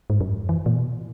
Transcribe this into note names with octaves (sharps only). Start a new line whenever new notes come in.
G#2
F#2
E3
A#2
B2